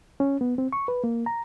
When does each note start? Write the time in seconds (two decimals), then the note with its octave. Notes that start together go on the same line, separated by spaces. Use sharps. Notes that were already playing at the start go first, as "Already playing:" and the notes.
0.20 C#4
0.41 B3
0.58 C4
0.73 C#6
0.88 B4
1.04 A#3
1.26 A#5